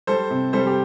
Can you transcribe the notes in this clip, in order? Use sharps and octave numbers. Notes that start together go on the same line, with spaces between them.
G3 A4 C5
C3
G3 A4 C5
G4